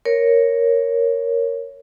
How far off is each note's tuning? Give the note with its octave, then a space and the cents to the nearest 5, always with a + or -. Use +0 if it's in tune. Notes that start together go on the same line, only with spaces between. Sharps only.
A#4 +0 C#5 +0